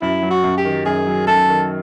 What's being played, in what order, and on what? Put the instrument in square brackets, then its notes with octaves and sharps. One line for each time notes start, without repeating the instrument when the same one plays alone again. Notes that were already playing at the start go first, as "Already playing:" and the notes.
[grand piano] F#2 [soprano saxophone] E4
[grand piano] F#3
[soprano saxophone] F#4
[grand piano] F#2
[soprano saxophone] G4
[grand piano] D#3
[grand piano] F#2 [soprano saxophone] G#4
[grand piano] F#3
[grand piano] F#2 [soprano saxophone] A4
[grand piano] D#3